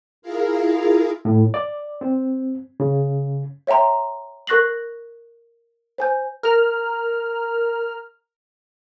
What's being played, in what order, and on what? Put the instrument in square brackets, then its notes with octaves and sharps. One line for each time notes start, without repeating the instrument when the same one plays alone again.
[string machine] E4 F4 G#4 A#4 F5
[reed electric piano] A2
D5
C4
C#3
[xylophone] C#5 E5 G5 A#5 C6
A#4 C#6 F#6 A#6 C7 F#7
C5 G#5 G6
[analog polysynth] A#4 F6